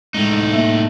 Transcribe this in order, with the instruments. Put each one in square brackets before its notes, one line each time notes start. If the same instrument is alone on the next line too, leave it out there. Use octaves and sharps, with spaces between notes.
[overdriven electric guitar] A2 D#4 [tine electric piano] G#3
[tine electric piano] A#3 E5